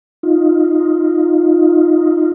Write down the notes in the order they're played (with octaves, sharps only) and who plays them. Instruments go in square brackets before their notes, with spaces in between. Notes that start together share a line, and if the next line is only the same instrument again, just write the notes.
[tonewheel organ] D#4 F4